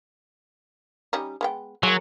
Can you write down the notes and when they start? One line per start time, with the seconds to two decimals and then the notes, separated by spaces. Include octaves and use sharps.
1.13 G3 C#4 D#4
1.41 G#3 B3 G5
1.83 F#3 G#3 A#3